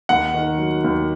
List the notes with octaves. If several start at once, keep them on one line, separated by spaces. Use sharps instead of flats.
D#2 F#5
D#3
F#3
D#2